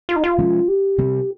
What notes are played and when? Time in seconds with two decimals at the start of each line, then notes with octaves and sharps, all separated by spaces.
0.09 F4
0.16 D#4
0.24 F4
0.38 C3 F3 G#3 C#4
0.68 G4
0.98 C3 G3 C4